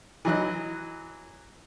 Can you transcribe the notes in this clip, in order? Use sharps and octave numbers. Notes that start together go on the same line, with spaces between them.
E3 F#3 D#5 F#6